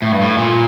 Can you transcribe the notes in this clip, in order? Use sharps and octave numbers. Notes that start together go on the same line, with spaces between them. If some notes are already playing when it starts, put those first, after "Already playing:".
A2
G2
A2
A#2